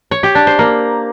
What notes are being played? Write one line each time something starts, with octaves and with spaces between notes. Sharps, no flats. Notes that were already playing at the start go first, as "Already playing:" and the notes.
C#5
G4
D4
C5
A#3